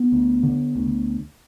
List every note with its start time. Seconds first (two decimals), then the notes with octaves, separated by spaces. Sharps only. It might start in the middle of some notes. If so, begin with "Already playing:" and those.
Already playing: B3
0.12 D2
0.43 D3
0.76 D2